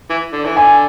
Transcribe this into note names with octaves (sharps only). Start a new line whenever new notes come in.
E3
D3
E3
D3 G#5